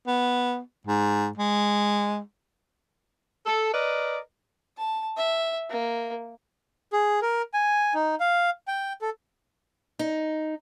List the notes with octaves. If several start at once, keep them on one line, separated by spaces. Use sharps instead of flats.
B3
G#2
G#3
A4
A#4 B4 D5 D#5
A5
E5
A#3
G#4
A#4
G#5
D#4
F5
G5
A4
D#4